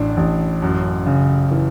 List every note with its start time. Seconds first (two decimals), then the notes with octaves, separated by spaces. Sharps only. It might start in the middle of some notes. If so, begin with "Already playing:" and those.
Already playing: A1 A2 D4
0.17 A1
0.62 F#2
1.06 C#3
1.51 E3